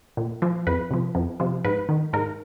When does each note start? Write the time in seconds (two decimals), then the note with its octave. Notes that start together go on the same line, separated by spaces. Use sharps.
0.17 A#2
0.42 F3
0.67 F2 B4
0.91 C3 F3
1.15 F2
1.40 C3 F3
1.65 G#2 B4
1.89 D#3
2.13 G#2 A#4